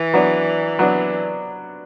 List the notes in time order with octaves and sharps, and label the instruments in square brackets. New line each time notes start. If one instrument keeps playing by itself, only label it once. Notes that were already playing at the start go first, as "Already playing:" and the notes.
Already playing: [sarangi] E3
[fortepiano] F#3 B3 D4
F#3 B3 D4